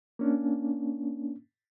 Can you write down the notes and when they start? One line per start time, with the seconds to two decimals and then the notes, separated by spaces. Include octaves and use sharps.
0.19 A#3 C#4 D4